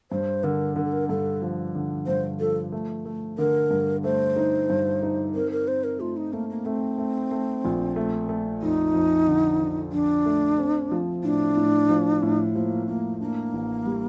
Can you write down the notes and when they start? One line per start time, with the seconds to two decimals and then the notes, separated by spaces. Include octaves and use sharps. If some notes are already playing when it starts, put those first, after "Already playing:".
0.11 G2 C5
0.44 D3 A#4
0.76 D3 A#4
0.84 A4
0.92 A#4
1.09 G2 A4
1.42 F3
1.75 D3
2.07 G2 C5
2.40 F3 A4
2.72 A3
3.05 A3
3.38 D3 A#4
3.71 G2
4.04 A3 C5
4.36 D#4
4.70 G2
5.02 D#4
5.34 C4 A#4
5.52 A#4
5.67 C4 C5
5.84 A#4
6.00 A3 F4
6.17 D#4
6.33 A3 A#3
6.50 A#3
6.66 A3 C4
6.98 A3
7.31 A3
7.65 A#1
7.96 A3
8.29 A3
8.62 F2 D#4
8.94 F2
9.28 D3
9.61 D3
9.92 F2 D4
10.26 A3
10.58 C4
10.91 F3
11.24 A2 D4
11.57 A2
11.89 F3
12.23 A2
12.55 F3 A#3
12.87 A2 A#3
13.20 A#3 D4
13.53 A1
13.86 G3